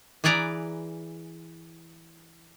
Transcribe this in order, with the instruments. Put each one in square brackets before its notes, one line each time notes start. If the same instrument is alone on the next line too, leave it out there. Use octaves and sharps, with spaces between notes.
[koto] E3 G#4 B4 D5 A#5